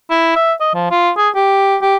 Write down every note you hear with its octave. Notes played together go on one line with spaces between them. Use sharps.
E4
E5
D#5
F3
F4
G#4
G4
G4